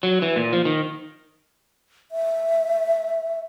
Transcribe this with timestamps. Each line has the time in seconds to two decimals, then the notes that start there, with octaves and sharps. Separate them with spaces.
0.03 F#3
0.22 E3
0.36 A#2
0.53 F3
0.65 D#3
2.12 E5